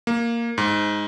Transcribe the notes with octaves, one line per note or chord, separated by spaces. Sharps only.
A#3
G#2